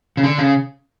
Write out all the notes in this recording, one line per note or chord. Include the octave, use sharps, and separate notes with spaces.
C#3
D3
C#3